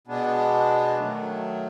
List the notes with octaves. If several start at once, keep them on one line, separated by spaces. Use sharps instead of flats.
B2 G#3 B3 D4
D#3 F#3 A3